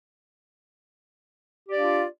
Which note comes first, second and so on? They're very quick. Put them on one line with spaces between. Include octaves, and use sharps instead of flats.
G4 D5 D4 F5 F4